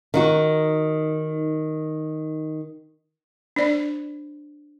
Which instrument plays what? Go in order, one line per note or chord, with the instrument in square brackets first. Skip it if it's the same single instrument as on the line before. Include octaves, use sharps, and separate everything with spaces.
[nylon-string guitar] D#3 D#4 F#4
[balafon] D4 C5 D5